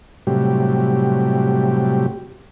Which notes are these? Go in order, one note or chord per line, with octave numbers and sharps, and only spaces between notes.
A2 C3 F#3 G3 G4